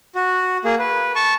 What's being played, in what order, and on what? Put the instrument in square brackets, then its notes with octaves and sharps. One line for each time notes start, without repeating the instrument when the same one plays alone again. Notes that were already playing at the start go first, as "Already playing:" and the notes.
[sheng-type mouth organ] F#4
A#3 G#4
B4
A5 C#6